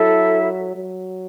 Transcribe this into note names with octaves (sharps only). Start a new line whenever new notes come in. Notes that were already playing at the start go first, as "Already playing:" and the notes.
Already playing: F#3 E4 A4 E5
F#3